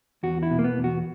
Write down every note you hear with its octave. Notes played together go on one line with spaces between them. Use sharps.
E2 F#4
E4
B2
A#3
B3
E2
F#4